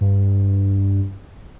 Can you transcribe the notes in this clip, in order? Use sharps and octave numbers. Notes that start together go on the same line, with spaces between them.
G2